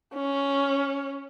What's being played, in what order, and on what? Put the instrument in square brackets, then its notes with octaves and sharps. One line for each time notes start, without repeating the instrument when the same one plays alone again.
[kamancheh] C#4